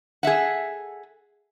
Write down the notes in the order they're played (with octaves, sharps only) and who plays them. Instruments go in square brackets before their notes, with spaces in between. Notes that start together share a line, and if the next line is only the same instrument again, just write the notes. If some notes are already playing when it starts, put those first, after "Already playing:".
[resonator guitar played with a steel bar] G#4 A4 E5 F#5